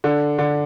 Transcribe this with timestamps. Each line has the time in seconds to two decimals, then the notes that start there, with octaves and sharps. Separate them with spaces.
0.04 D3
0.39 D3